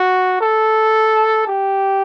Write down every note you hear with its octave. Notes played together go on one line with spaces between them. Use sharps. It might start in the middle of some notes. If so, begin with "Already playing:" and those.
Already playing: F#4
A4
G4